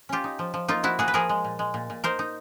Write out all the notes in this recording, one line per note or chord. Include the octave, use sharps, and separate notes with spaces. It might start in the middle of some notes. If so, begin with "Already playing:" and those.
C#4 F4 G4
D#4
F3
F3
A#3 D#4 F4
F3 E4 F#4
A#3 F#4 G#4
B4
F3 G#4 A#4
G#3
A#2
G#3
A#2
A#2
D#4 A#4 C5
D#4